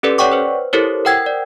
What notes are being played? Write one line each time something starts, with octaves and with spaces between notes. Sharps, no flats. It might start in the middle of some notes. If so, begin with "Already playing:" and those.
C#4 G4 A4 B4 D5
C#5 D5 F#5 G5 C#6 D6
B4 C5
E4 G4 A4 A#4 C5 C#5
A#4 C5 F#5 G5 E6 G#6
D5